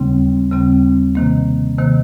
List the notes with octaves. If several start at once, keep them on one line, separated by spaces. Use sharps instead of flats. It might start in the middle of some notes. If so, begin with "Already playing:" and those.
Already playing: D#2 C#3 G3 C4
D#2 C#3 G3 C4
C3 D#3 A#3
C3 D#3 A#3